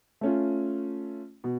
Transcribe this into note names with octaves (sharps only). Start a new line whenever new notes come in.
A3 C#4 F4
B2